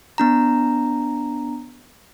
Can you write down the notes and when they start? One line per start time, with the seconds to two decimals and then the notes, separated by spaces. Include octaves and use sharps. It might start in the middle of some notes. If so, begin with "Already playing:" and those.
0.18 B3 D4 A#5